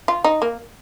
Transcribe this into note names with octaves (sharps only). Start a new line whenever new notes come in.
F4
D#4
A#3